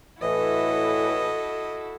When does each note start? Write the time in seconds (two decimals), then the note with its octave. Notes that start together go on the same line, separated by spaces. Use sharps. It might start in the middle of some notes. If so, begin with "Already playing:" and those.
0.21 A2 E3 E4 F#4 A4 D#5